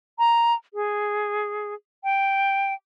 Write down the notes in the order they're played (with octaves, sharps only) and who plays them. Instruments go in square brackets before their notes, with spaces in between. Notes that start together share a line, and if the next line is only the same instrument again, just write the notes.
[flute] A#5
G#4
G5